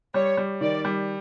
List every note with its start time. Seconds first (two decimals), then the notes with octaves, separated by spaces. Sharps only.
0.14 G3 C#5
0.37 G3
0.61 D#3 D5
0.85 G3